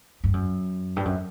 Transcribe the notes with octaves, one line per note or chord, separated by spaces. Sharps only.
G2
F#2
G2
F#2